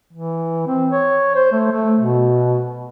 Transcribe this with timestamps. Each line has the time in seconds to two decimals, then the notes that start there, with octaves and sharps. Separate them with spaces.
0.13 E3
0.67 C4
0.91 C#5
1.35 C5
1.52 A3
1.72 A3
2.00 B2